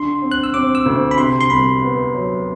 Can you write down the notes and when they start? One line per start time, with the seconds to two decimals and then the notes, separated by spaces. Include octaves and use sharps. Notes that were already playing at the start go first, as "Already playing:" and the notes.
Already playing: D3 C6
0.22 C4
0.32 F#6
0.44 E6
0.54 C4 D6
0.75 E6
0.86 D2
1.11 B5
1.18 C3 C6
1.41 C6
1.50 C2 B5
1.82 B3
2.14 F#3